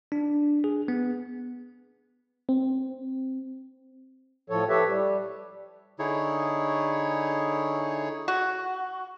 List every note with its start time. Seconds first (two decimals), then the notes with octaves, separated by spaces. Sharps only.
0.12 D4
0.64 G#4
0.88 B3
2.49 C4
4.50 A2 F3 A4 C#5
4.69 G4 A4 B4 C#5 E5
4.88 G3
5.99 D3 D#4 E4 G#4 C#5
8.28 F#4